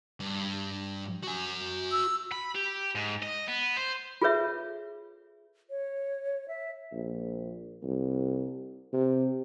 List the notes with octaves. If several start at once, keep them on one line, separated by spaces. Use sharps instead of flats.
G2
F#4 G#5
E6
B5
G4
G#2
D#5
B3
C5
F4 G#4 A4 B4 C#5 E5
C#5
E5
A#1
C2
C3